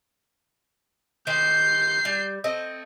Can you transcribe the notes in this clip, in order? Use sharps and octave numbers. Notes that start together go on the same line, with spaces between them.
D#3 G4 C5 G6 C7
G3
A3 C4 D#5